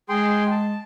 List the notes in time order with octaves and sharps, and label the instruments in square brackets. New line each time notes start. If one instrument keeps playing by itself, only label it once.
[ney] G#3 [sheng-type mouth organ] G#4 G5 C6
[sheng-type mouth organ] A5